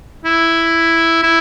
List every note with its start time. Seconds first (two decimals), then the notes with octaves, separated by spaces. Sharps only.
0.25 E4
1.23 E4